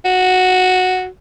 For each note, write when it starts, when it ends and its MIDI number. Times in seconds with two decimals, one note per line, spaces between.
0.05 1.06 66